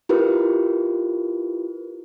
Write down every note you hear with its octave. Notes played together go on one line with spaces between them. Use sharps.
E4 F4 G4 A#4 B4